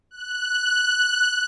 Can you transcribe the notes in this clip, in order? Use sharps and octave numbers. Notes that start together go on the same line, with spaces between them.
F#6